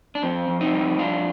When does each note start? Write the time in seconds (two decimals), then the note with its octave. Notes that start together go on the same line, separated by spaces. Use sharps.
0.15 D4
0.23 F2 C4
0.48 F2
0.61 C4 D#4
0.74 G3
0.99 F2 D4 F4